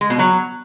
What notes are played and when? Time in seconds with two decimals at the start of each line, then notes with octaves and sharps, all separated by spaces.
0.01 G#3
0.10 B2
0.19 F#3